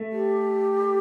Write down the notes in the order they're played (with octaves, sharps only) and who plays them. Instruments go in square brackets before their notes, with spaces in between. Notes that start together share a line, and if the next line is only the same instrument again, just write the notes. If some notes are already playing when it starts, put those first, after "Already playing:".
Already playing: [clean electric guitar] A3
[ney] G4